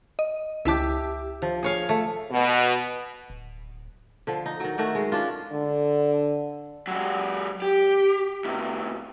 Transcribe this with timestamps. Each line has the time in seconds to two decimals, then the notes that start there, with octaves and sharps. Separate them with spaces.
0.19 D#5
0.65 C#2 E4 G4 E5 A5
1.42 F3
1.63 G#4 C#5 F5
1.89 A3
2.30 B2
3.30 D1
4.27 D3 F3
4.46 D#4
4.60 D#3 F#3
4.78 D#3 A3 F#4
4.95 G#3
5.12 C#4 D4 F4
5.52 D3
6.87 F#3 G#3
7.62 G4
8.45 A2 C3